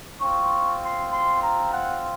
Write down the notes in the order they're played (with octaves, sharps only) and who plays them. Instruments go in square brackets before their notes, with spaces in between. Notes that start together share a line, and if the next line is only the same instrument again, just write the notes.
[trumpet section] C4 F4 C#6
C6
C6
A#5
F#5